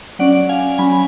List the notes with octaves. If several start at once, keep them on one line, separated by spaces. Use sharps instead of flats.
F#3 C#4 D5 F#5
F5 G#5
F#3 C#4 G#5 B5